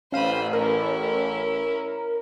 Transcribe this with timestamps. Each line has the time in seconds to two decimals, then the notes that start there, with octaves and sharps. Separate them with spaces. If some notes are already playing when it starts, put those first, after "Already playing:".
0.12 A1 C#4 C5 F5 B5 D#7
0.53 C#4 E4 A#4